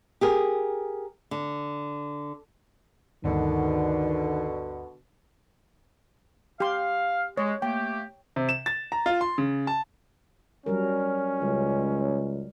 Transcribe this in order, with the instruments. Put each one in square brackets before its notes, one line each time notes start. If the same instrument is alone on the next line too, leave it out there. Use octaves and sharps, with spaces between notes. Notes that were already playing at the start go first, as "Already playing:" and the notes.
[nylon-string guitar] G4 G#4 A#4
D3
[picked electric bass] G1 D2 [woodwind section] B2 D3 [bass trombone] D#3
[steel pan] G4 C6 [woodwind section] F5
[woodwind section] G#3 [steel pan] C#5
[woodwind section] A3 A#3 G4 [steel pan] G5
[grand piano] C3
E7
A6
A#5
F4
C6
C#3
A5
[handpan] F#3 G3 A#4 [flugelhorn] C#4
[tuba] C#2 [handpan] G3